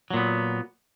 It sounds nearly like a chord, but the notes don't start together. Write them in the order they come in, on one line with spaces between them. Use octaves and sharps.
F#3 A#2 B3